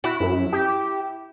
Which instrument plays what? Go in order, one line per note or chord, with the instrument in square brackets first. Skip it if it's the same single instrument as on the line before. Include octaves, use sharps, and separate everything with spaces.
[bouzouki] E4 [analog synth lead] F#4
[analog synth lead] F#2
G4